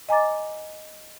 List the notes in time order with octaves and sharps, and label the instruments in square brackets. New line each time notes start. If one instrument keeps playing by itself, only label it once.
[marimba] D#5 G#5 A#5 D6 A6